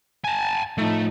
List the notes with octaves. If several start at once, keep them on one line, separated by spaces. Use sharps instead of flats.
G#5 A5
A2 F3 A3 D#4